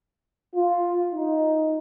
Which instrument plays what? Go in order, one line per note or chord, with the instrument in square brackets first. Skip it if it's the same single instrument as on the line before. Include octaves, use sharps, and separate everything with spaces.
[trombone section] F4
D#4